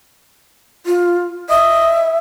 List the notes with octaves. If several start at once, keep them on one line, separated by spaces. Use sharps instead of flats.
F4
D#5 E5